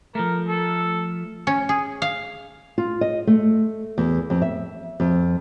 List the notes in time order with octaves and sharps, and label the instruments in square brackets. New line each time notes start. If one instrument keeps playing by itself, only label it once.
[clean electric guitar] F3 A3 [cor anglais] A#4
[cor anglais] A4
[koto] C#4
G#4
F5
[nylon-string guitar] F4
D#5
A3
E2
F2
E5
F2